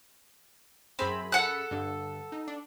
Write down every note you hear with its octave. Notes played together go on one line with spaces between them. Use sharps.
F#2 C4 G#4 B5
A4 F#5 F#6
G2 D3
D#4
D4